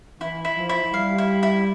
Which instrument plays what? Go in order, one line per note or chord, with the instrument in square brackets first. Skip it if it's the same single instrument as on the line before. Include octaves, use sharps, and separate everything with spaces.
[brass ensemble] E3 [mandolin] E4
[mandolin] E4
[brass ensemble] F3
[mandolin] E4
[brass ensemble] G3 [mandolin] F5
[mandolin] E4
E4